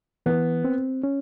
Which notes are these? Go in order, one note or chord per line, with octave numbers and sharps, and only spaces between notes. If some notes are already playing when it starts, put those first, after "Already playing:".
E3 B3
C4
C#4